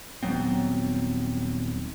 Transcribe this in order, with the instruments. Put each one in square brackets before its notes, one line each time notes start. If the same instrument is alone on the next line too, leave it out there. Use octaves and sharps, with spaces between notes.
[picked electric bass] D#1 F#3 B3 C4